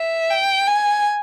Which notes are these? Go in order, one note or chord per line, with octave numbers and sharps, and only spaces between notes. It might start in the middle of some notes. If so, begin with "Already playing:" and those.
Already playing: E5
G5
G#5